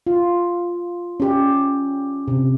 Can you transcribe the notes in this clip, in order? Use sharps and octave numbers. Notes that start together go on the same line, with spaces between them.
F4
C#4 G4
C3